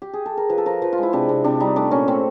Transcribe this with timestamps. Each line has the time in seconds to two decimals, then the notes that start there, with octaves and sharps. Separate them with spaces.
0.02 G4
0.13 G#4
0.26 A4
0.37 A#4
0.49 F3 B4
0.58 A4
0.66 F3 A#4
0.82 F3 B4
0.93 F4
0.98 G#3
1.03 E4
1.13 C3 D4
1.29 C3
1.44 C3 D4
1.60 G3 D#4
1.76 A3 D4
1.91 A#2 C#4
2.08 A3 C4